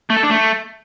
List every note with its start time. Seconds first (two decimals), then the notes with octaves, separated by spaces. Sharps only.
0.10 A3
0.17 A4
0.23 D4
0.30 A3